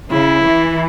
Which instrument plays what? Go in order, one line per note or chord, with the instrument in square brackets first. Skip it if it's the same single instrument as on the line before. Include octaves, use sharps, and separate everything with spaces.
[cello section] C#3 [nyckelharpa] E4
[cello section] E3